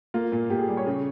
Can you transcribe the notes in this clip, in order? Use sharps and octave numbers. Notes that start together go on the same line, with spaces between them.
A#3 F4
A#2
A#2 G4
G#4
G3
C#5
C#3